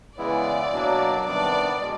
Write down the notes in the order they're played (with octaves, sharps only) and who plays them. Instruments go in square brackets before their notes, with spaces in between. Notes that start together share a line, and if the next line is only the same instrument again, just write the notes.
[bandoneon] C#3 E3 G#3 B3 E4 [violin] D5
[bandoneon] B2 F#3 A#3 D4
[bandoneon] C3 D#3 G3 B3 D4 [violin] D5
[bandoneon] B2 G#3